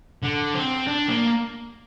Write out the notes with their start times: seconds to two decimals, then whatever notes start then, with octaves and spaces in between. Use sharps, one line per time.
0.22 D3
0.55 C4
0.87 D4
1.09 A#3